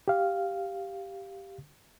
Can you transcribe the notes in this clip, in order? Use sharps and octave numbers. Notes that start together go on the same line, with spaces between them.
G4 F5